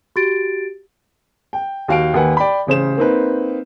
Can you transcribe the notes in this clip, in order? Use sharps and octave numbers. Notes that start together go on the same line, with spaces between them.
F#4 G4 A6 D7
G5
D#2 F#4 F5 G5 D7
D#2 A#3 B4 F#5 G#5
D5 G5 B5
A1 C#3 C5 E7
A#3 C4 D#4 B4